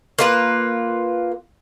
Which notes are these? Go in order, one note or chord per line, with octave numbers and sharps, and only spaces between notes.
A#3 F4 B4